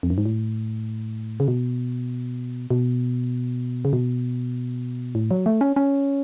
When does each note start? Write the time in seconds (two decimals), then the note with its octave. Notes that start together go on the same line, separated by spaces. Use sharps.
0.03 F2
0.10 F#2
0.18 G#2
0.25 A2
1.40 C#3
1.48 B2
2.71 B2
3.85 C#3
3.93 B2
5.15 A2
5.31 F#3
5.46 A3
5.61 C#4
5.76 C#4